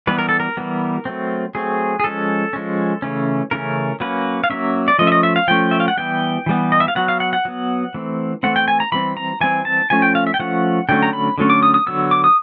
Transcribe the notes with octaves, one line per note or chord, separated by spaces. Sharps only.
E3 G3 B3 B4
A#4
A4
A#4
E3 G3 B3
F#3 A3 C4
F#3 A3 C4 G#4
G#4
F3 G#3 C#4 A4
F3 G#3 C#4
C#3 E3 A3 C#4
C#3 E3 A3 C#4 A#4
F#3 A#3 C#4 B4
F5
F#3 A#3 C#4 E5
D5
F3 A3 C#4 D#5
E5
D#5
E5
F5
F3 A3 C#4 G5
E5
F5
F#5
E3 G3 B3 G5
E3 G3 B3
D#5
E5
F5
F#3 B3 F#5
F5
F#5
F#5
F#3 B3
E3 A3 C4
E3 A3 C4 F#5
G5
G#5
A#5
E3 G3 C4 B5
A#5
E3 G3 C4 G#5
A5
F3 A3 C#4 G#5
G5
F5
E5
G5
F3 A3 C#4 F#5
D3 F#3 A3 C#4 G5
A#5
B5
D3 F#3 A3 C#4
D6
D#6
D#6
D3 F#3 B3 E6
D6
D#6